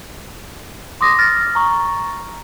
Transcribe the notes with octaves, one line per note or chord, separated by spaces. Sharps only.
C6 D6 D#6 A#6
F6 A6 A#6
A#5 C#6